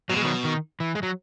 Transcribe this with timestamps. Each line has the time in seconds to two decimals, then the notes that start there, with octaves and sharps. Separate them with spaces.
0.10 B2 F#3
0.17 G#3
0.25 D#3 F#3
0.44 D#3
0.80 E3
0.95 G#3
1.03 F#3